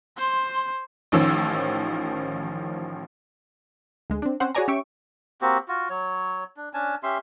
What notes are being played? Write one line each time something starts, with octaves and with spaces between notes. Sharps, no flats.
C5 C6
A1 D#3 F3 C#4 E6
D2 G#3
C4 D4
C4 C#4 C5 F#5
F#4 G#4 C#5 D5 G#5 A#5
C#4 G4 E5 C#6 D7
A#3 C4 F#4 G4
F4 F#4
F#3 C#5
D4
C#4 D4 G#5 A5
C#4 G4 E5 C6